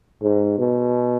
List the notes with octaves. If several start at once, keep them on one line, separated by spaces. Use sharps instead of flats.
G#2
B2